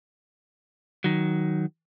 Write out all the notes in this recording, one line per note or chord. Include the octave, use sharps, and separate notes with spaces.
D#3 F#3